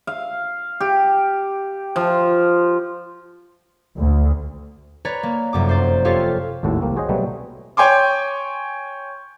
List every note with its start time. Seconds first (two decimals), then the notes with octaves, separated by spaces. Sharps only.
0.07 F5
0.80 G4
1.96 F3
3.97 D2
5.05 B4 C#5 D5 A#5
5.23 A#3
5.53 F1 F#2 D6
5.69 C5 D5
6.05 F4 G4 A4 C#5 F5
6.63 G#1 D#2 A2 F#4 A4
6.81 C2 A#3 C4
6.96 F#4 G#4 C5 C#5 D#5
7.09 B2 F#3 G3 A3 B3 C4
7.77 C#5 G5 G#5 C6 D6